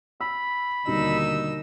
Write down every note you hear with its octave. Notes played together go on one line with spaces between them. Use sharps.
B5 E6
D#2 B2 D3 G3 D#4 E6